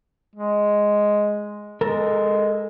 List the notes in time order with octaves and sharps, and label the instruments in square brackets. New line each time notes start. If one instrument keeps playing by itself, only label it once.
[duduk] G#3
[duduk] G#3 [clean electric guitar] A4 A#4